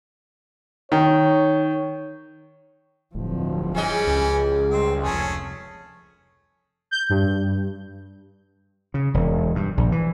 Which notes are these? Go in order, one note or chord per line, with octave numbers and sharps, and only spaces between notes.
D#3 C#5
D1 G2 F3
E3 G3 C#4 G#4 D#5
C#2
G3 C4
F1 A3 C#4 G#4
G6
G2
C#3
E1
G2
A#1
E3